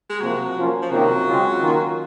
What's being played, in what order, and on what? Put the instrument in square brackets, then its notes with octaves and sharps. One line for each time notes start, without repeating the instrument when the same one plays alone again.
[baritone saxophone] G#3
[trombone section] C3 F3 A#3 [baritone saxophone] F#3
[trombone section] F3 A#3 C#4 F4
[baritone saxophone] F3
[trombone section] C3 D#3 A#3 C#4 F4 [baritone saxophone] F#3
[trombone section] C#3 G#3 C4 F4
D#3 A#3 C#4 F4